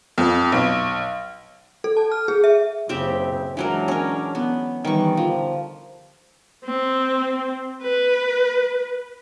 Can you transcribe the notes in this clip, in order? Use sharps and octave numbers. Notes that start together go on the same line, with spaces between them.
F2
B1
A4
A5
F6
G#4
E5
F#1 C#3 C4 G4 E5
E3 F#3 G#3 D4 A#4
C#4 A#4
B3
D#3 E3 G3 C#6
D3 F3
C4
B4